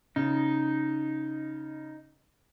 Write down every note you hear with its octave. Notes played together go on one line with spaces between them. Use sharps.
C#3 D#4